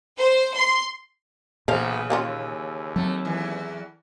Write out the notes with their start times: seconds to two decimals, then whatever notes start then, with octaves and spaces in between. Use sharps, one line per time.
0.17 C5
0.55 C6
1.68 B1 A#2 C#3 E3 A#4 C5 F5
2.10 D#2 A#3 C#4 F4
2.96 F#3 A3 C4
3.25 E2 E3